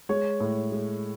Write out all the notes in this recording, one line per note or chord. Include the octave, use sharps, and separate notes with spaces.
G#3 C#5
A2
G#3